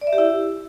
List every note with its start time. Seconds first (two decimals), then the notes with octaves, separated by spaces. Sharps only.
0.01 D5
0.07 E5
0.13 G4
0.18 E4